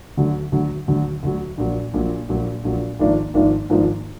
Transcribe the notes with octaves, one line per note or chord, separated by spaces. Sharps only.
D2 D3 F#3
D2 D3 F#3
D2 D3 F#3
D2 D3 F#3
A#1 A#2 F#3
A#1 A#2 F#3
A#1 A#2 F#3
A#1 A#2 F#3
G#1 G#2 F3 A#3 D4
G#1 G#2 F3 A#3 D4
G#1 G#2 F3 A#3 D4